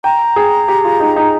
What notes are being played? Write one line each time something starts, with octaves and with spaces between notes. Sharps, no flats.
G5 A#5
G#4
G4
F4
D#4
D#4